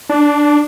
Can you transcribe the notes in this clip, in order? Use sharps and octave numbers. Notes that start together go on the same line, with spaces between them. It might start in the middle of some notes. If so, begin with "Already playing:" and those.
D4